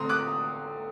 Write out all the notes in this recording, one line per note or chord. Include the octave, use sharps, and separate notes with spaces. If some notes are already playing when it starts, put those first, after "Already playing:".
Already playing: D3 A3 C4 A#5 C6 D#6
D6 F#6